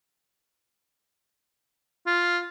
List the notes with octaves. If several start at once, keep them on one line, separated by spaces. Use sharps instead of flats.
F4